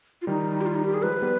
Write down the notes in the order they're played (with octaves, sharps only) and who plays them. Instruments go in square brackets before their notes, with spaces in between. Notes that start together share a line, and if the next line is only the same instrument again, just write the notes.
[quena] F4
[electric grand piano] D#3 G3 [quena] D#4
[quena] G4
F4
D#4
G4
G#4
[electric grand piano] F3 G#3 [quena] B4
[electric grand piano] G3 B3